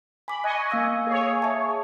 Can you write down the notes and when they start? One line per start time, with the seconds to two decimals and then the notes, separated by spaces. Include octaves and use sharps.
0.28 G#5 B5 D6
0.44 D#5 G#5 C#6 F#6
0.71 A#3 F5 E6
1.07 G#4 C#5
1.42 E5 A5